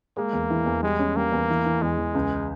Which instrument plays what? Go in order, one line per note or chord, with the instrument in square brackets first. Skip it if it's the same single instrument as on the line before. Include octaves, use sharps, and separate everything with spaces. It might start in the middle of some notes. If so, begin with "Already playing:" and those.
[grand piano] G#3 [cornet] A#3
[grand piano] E2
E3
E2
[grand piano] G3 [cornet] G#3
[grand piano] C#4
[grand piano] G3 [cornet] A#3
[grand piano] E2
E3
E3
[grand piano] E2 [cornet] G#3
[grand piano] E2
C#2